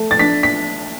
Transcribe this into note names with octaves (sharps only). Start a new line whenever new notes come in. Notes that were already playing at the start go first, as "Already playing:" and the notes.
Already playing: A3
A6
D4 B6
B6